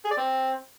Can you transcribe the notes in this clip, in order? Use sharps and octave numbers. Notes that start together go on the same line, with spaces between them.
G#4
D5
C4